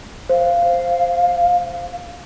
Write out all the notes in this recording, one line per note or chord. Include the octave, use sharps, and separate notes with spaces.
C5 F5